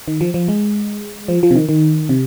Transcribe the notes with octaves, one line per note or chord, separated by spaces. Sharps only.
D#3
F3
F3
G#3
F3
F3
C3
D#3
D#3
C3